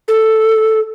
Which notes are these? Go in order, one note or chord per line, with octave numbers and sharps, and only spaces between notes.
A4